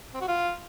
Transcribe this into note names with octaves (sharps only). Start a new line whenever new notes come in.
C4
F#4
F4